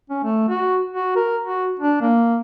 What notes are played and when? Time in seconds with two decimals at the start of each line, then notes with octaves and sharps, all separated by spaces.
0.10 C#4
0.24 A3
0.48 F#4
0.93 F#4
1.16 A#4
1.44 F#4
1.80 D4
2.01 A#3